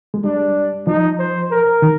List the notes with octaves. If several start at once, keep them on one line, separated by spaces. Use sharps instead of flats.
G#3
G3 D4
F3 D#4
C5
A#4
D#3